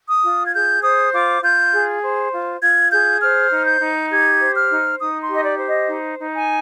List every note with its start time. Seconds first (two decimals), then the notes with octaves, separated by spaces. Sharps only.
0.09 D#6
0.24 F4
0.46 G#6
0.53 G#4 G6
0.83 C5 D#6
1.13 F4 D6
1.42 F4 G6
1.72 G#4
2.02 C5
2.32 F4
2.61 F4 G#6
2.91 G#4 G6
3.21 C5 F6
3.50 D#4
3.66 G6
3.80 D#4
4.10 G4 G#6
4.40 C5
4.55 F6
4.70 D#4
4.99 D#4 D#6
5.22 C6
5.29 G4
5.34 D#5
5.44 D5
5.59 C5
5.66 D#5
5.88 D#4
6.19 D#4
6.33 G#5